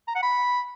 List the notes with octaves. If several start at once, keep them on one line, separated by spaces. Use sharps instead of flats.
A#5
F#5
B5